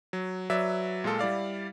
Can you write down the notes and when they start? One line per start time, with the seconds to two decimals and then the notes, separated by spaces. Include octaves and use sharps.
0.13 F#3
0.50 F#3 B4 D5 E5
1.04 A#2 G#3 F4 A4
1.19 G3 E4 D5 F5